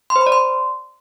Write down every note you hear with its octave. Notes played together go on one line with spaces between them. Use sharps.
C6
C5
B5
D5
C6